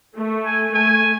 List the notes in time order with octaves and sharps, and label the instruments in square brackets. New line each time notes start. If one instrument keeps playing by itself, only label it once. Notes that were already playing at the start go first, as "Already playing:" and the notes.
[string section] A3
[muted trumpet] G#5
[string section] A3 [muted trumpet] G#5